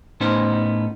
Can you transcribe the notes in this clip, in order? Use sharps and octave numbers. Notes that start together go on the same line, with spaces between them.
A2 B3 C#4 D#4 C5